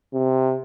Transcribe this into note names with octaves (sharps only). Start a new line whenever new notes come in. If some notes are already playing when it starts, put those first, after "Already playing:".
C3